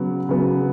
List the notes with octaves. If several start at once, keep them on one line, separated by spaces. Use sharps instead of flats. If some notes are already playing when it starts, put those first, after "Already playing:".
Already playing: C#3 F#3 B3
C#3 F#3 B3